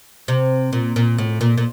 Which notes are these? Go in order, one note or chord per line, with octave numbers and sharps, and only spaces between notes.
C3
A#2
A#2
A2
A#2
A#2